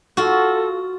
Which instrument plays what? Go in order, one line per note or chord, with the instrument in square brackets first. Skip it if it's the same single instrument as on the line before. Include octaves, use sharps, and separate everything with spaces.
[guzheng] F4 F#4 [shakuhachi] A4